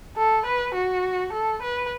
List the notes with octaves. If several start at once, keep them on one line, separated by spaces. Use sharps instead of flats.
A4
B4
F#4
A4
B4